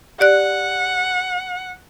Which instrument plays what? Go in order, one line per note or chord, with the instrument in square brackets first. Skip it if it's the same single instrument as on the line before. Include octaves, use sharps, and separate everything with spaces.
[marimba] G4 D5 F#6 [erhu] F#5